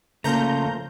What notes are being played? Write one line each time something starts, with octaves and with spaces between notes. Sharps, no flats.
C#3 F3 A3 A#3 F4 C5 A#5 G6